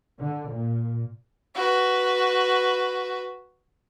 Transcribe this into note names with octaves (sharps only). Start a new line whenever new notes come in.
D3
A#2
F#4 B4